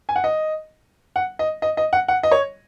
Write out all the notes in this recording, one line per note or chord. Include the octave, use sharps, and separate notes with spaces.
G#5
F#5
D#5
F#5
D#5
D#5
D#5
F#5
F#5
D#5
C#5